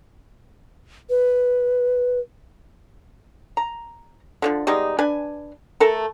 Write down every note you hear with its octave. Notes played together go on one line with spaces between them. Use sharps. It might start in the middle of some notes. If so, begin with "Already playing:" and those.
B4
A#5
D3 E3 F3
G3 G#3 B3 D#4
D4 B4 G#5
A3 A4 A#4